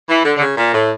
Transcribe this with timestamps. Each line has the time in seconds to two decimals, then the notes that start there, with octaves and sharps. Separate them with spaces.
0.09 E3
0.25 D3
0.37 D3
0.41 C#3
0.57 A#2
0.73 A2